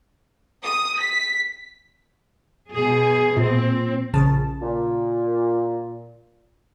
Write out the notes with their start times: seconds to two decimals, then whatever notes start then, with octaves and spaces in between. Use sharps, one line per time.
0.64 D#6
0.99 B6
2.71 B2 G#4
3.37 A#2 C4
4.13 A#1 C#3 A5
4.62 A#2